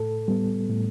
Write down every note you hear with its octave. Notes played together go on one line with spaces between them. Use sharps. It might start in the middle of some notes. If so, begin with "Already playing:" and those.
Already playing: A2 A4
G3 B3
A2